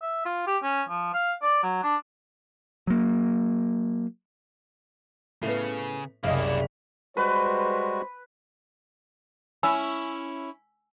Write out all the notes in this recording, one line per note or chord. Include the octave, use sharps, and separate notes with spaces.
E5
F4
G4
C#4
F3
F5
D5
F#3
D4
F#3 A#3
A2 C#3 B3
F#1 C2 A#3 E4 D#5 F5
G3 G#3 F#4 B4 C5
C#4 E4 G#5 E6